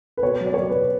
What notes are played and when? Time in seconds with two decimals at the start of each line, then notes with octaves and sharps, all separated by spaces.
0.17 B4
0.23 B2 C#5
0.41 F#3
0.46 D5
0.54 C#5
0.58 F#3 D5
0.69 B4
0.75 B2